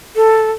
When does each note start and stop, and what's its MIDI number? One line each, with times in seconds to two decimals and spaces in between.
0.16 0.51 69